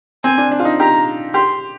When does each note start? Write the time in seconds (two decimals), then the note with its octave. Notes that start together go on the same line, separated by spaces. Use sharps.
0.24 C4 G#5
0.38 D4
0.52 D4
0.60 F4
0.65 D#4
0.80 G4 A#5
1.34 G4 C6